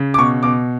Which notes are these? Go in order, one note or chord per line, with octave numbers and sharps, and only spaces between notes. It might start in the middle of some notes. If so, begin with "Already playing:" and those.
Already playing: C#3
D6
B2 C#6
B2 D6